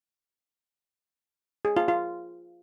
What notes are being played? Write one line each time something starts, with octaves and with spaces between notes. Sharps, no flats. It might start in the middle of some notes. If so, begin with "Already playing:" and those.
G#4
F4
F4